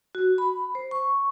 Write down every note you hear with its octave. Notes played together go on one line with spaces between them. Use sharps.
F#4
B5
C5
C#6